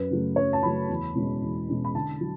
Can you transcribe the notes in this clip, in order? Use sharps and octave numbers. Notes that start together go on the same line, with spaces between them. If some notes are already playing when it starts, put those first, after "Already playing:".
Already playing: F#2 B4
C#3 F#3 A3
F#2 C#5
A5
C#3 F#3 A3 B5
E2
B2 G#3 C#4
E2
B2 G#3 C#4
B5
D3 A5
F#3